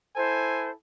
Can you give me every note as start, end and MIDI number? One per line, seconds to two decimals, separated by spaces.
0.16 0.72 64
0.16 0.72 69
0.16 0.70 72
0.16 0.72 80